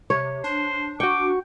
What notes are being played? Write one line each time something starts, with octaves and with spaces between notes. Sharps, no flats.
C3 C#5
D4 C5
F#4 G5 C#6 D6